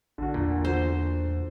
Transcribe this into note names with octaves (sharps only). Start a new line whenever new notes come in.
A1 D3 F#4
E2 A#2
C5